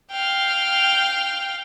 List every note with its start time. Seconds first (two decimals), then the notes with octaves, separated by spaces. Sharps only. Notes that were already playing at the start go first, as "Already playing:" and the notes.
0.10 F5 G5